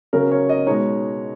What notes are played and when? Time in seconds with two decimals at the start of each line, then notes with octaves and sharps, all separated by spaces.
0.13 C#3 F#3 C#4 A#4
0.31 C#5
0.49 D#5
0.67 B2 G#3 D#4 C#5